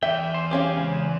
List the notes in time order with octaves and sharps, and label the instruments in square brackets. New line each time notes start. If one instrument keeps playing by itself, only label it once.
[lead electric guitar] E2 [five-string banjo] E5 [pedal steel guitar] G5
[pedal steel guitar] C5
[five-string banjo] C4 C#4 F5 [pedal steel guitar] G4 G#4
[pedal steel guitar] C#3 G#3